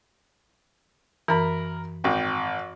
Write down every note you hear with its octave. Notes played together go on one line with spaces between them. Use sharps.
F#2 E3 A#4 B5
G#1 G5